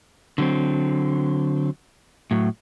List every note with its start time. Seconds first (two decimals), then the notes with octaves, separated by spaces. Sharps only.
0.38 D3 F#3 C4
2.31 A2 F#3